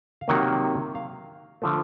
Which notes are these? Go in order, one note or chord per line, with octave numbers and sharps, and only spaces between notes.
F5
C3 D#3 F#3 A#3 F#5
F5
D3 F3 A3